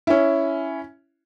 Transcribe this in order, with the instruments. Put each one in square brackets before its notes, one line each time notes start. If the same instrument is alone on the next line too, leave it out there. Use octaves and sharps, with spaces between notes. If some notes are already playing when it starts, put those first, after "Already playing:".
[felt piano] C#4 E4